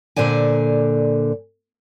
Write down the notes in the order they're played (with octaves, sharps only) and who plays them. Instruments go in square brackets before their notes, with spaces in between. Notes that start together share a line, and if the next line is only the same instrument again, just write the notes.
[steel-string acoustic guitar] A#2 D3 C5 D5 G#5